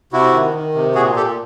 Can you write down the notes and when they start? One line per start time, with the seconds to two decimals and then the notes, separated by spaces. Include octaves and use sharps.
0.13 C3 E4 F#4
0.33 D#3
0.54 D#3
0.75 C3
0.95 A#2 F#4 G#4
1.16 A#2 G4 A4